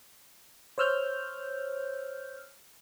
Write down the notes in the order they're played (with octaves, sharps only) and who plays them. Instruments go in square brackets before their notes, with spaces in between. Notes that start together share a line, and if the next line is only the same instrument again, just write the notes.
[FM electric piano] C5 C#5 E6 F6 G6